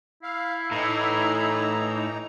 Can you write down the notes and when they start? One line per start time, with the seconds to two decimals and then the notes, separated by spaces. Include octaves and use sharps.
0.23 E4 F5
0.71 A2 E3 D#4 A#5